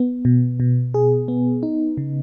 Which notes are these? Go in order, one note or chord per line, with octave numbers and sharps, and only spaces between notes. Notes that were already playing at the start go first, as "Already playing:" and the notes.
Already playing: B3
B2
B2
G#4
B3
D#4
C#3